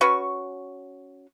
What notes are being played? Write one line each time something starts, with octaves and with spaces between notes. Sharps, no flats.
C#4 F#4 B4 C#6